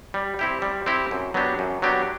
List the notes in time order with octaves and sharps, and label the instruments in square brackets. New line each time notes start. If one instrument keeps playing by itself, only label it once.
[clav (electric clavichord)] G3
C4 E4 G4
G3
C4 E4 G4
F#2
F#3 B3 D4 G4
F#2
F#3 B3 D4 G4